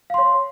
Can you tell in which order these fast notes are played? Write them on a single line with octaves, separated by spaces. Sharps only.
F5 C6 C#5